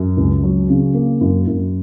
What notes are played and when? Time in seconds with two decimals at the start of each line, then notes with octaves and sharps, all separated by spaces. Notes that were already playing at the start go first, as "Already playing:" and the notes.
Already playing: F#2
0.17 C#2
0.43 F#3
0.70 C#3
0.94 A#3
1.21 F#2
1.47 F#2